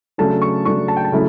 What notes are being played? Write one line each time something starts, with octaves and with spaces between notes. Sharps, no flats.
C#3 F#3 A3 D4 A5
C#6
C#3 F#3 A3 D4 C#6
A5
G5
A5
C#3 F#3 A3 E4